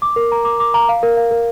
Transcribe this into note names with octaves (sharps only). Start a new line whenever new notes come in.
D6
A#4
A#5
D6
D6
A#5
F5
A#4
F5
A#4